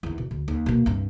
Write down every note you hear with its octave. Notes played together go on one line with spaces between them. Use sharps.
E2 D#3
B2
D2
D#2
B2 A#3
C2 G2